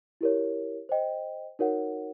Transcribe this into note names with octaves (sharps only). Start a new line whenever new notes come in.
E4 G4 A#4 C#5
C5 D#5 G5
D#4 F#4 A#4 C#5 F#5